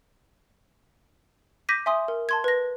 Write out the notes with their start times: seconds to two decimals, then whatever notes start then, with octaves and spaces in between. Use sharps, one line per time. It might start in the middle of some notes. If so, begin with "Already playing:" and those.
1.69 D6 G6 A#6 B6 D#7
1.86 E5 G#5 C6 D#6
2.08 A#4
2.29 A5 C6 G#6
2.44 B4 A#6